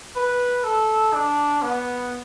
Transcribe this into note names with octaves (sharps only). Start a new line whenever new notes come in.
B4
A4
D4
B3